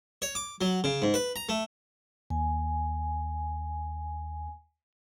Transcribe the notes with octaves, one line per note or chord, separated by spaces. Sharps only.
C#5
D6
F#3
C#3
G#2
B4
A#5
A3
D#2 G#5